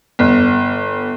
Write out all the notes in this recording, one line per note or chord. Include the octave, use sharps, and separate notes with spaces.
G1